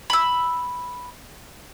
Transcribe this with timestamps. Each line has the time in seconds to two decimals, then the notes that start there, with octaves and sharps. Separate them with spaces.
0.10 B5 E6